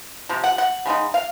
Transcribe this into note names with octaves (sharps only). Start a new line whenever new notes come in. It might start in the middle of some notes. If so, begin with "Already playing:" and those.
C3 F3
F#5
F#5
C#3 G#3 D#4
F5